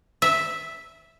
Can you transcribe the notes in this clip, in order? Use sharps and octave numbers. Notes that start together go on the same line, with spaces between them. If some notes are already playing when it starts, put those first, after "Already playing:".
E5